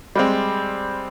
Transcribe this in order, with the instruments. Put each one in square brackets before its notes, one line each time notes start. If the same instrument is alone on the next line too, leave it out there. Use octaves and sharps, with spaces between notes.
[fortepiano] G3 G#3 C4